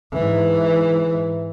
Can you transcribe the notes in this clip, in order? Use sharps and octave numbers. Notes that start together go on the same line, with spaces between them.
G#2 E3